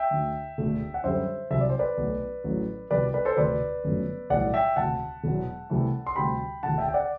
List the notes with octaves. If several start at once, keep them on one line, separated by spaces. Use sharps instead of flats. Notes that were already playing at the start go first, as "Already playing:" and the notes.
Already playing: E5 G5
D2 D3 A3
E1 D2 D3 A3
F#5
F#2 D3 G3 C5 E5
C2 C3 F#3 E5
D5
C5
B4 D5
B1 B2 F#3 A3
A1 A2 F#3 A3
C2 B2 G3 B4 D5
B4 D5
A4 C5
E1 D2 C3 B4 D5
G1 F#2 F#3 A3
B1 A2 E3 G3 D5 F#5
E5 G5
E1 D2 C3 F#5 A5
E1 E2 B2 F#3
C2 C3 E3 A3
C6
D2 C3 G3 G5 B5
E1 D2 D3 F#5 A5
E5 G5
G5
D5 F#5